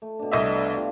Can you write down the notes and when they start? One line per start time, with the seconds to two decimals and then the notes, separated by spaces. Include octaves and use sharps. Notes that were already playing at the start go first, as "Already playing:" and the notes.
0.02 A3
0.19 B2 D4
0.32 C2 D#5 E5
0.55 D5 F5 B5
0.76 F4 G4 F5